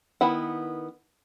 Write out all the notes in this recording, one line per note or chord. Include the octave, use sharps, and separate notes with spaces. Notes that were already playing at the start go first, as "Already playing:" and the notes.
D#3 B3 E4 F#5